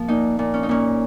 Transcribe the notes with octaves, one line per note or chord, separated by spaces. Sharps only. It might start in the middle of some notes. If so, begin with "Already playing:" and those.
Already playing: F3 A#3
A#2 D#4
A#2
C#4
D#4
A#2 C#4